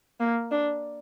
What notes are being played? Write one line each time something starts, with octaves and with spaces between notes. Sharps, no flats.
A#3
D4